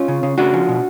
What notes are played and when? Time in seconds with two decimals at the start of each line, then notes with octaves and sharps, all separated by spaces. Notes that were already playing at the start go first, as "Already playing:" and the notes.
Already playing: C#4 F4
0.08 C#3
0.23 C#3
0.38 C#3 D4 F#4
0.54 F3
0.69 B2